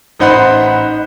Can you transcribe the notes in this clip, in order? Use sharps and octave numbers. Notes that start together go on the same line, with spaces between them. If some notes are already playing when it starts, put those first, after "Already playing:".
A1 D#4 C5 F#5 B5 F#6